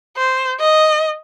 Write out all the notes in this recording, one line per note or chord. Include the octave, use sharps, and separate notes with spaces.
C5
D#5